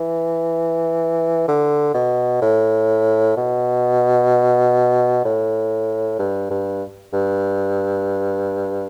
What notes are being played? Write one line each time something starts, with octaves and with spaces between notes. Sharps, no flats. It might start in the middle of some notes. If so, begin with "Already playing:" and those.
Already playing: E3
D3
B2
A2
B2
A2
G2
G2
G2